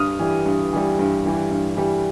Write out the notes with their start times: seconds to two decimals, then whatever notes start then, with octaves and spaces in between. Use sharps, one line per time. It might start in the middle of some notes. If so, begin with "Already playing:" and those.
Already playing: G2 D#6 F6
0.19 E3 G3
0.46 G2
0.73 E3 G3
0.99 G2
1.25 E3 G3
1.51 G2
1.77 E3 G3